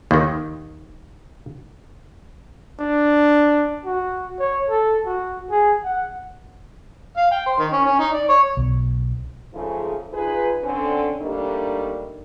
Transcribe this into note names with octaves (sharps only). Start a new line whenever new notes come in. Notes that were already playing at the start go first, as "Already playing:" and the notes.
D#2 D#3
D4
F#4
C#5
A4
F#4
G#4
F#5
F5
G5
C5
D#3
C#4
C#4
D#4
D5
C#5
B1
F2 G#2 C#3 F3 A3 G#4
D#4 F4 G#4 B4
D3 C4 C#4
G3 A3 A#3 D4 D#4